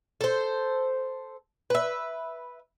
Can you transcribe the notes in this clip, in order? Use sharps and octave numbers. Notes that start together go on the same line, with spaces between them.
A4 C5
B4 E5